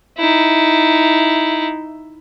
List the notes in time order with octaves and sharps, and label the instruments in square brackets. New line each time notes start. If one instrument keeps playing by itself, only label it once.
[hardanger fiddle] D#4 E4